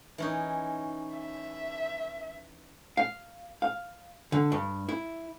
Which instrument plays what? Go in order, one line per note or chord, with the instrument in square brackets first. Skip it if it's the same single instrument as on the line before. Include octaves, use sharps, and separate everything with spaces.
[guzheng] E3 C#4 D#4
[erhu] E5
[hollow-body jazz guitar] F5
F5
D3
G2
E4